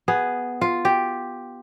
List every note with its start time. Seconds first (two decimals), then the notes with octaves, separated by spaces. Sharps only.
0.08 B3 G#4
0.61 F4
0.85 G4